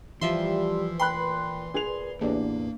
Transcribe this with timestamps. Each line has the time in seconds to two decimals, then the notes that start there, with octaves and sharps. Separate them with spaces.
0.21 E3 F3 G3 E5 C6
0.99 A#2 B4 G5 B5 C6 F#6
1.74 G#4 F7
2.21 A1 E2 A#3 D4